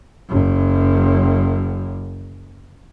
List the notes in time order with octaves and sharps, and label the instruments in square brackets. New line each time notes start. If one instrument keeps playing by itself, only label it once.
[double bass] F#1 F#2